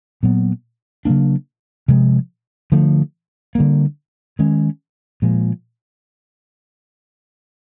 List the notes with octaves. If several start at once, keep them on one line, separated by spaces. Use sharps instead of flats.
A#2 F#3 B3
C#3 F#3 A#3 D4
C3 F3 G#3
D3 F3 A3
D3 G3 A#3
D#3 G#3 C#4
A#2 F3 G#3